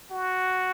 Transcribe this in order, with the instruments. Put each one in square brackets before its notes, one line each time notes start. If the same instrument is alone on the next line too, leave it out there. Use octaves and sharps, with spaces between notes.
[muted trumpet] F#4